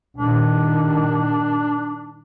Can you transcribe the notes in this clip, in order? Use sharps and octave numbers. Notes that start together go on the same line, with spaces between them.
G2 A#2 D#3 D4